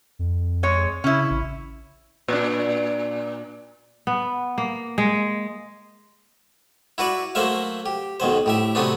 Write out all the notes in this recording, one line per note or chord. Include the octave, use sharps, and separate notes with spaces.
F2
G#3 C#5
C#3 C#4 E4
A1
A#2 D4
B3
A#3
G#3
E4 F#4 B4 D5
F#3 A3 A#3 C5 E5 F5
G4
B1 D#3 F#3 C5
A2 G4 E5
C3 F#3 A3 B3 C4 D4